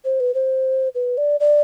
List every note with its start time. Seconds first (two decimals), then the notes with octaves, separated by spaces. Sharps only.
0.05 C5
0.20 B4
0.35 C5
0.95 B4
1.17 D5
1.40 D5